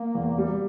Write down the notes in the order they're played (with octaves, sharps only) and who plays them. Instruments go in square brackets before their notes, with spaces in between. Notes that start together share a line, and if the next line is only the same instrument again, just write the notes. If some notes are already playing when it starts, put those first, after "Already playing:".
Already playing: [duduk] A#3
[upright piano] E2
G3